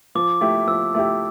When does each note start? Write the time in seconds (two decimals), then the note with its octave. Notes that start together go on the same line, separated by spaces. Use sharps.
0.15 F3 D6
0.41 A3 E4 G4
0.68 F3 E6
0.94 A3 E4 G4